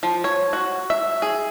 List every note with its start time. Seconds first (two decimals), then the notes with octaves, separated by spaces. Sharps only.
0.03 F3
0.24 C#5
0.53 F#4
0.90 E5
1.22 G#4